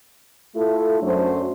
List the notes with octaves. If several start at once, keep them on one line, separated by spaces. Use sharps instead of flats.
A3 E4 F4 A4
F#2 F#3 A3 D4 C5